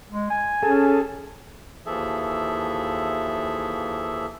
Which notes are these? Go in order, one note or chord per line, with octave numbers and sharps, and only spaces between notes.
G#3
G#5
C#4 G#4 A4
D#2 E3 F3 G#4 A4 E5